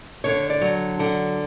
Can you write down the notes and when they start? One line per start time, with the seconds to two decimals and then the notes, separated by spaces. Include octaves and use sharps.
0.24 D3 C#5
0.50 D5
0.61 F#3
0.99 D3 F#5